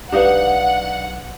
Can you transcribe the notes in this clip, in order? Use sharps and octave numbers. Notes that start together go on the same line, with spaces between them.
B1 D4 D#4 G4 B4 F5 F#5